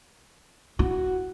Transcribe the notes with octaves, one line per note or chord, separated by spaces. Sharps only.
E4 F#4